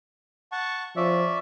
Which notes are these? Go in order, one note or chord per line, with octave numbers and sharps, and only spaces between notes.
F#5 A5 C#6
F3 C#4 D5 E5